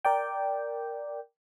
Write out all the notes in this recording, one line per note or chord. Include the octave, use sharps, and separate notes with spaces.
A#4 D5 G5